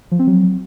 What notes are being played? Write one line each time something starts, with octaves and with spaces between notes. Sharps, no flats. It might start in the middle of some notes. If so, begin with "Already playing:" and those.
F3
C4
F#3